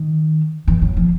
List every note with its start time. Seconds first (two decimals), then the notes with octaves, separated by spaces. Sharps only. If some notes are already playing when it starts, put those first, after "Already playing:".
Already playing: D#3
0.67 E3
0.82 F#3
0.97 F3